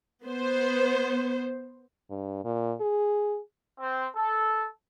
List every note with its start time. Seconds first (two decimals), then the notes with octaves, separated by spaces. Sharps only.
0.25 B3 C5
2.10 G2
2.44 A#2
2.81 G#4
3.79 C4
4.15 A4